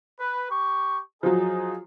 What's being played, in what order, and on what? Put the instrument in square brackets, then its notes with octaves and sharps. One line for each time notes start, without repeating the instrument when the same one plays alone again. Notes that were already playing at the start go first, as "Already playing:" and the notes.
[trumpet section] B4
G4 C#6
[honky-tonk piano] F3 F#3 [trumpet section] D#4 G#4